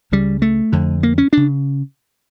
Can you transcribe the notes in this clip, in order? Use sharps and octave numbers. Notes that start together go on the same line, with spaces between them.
C#2 C#3 G3
A3
F2 D3
A#3
C#4
C#3 D4